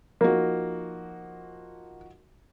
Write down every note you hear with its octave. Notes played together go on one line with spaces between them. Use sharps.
F3 A#3 D#4 F#4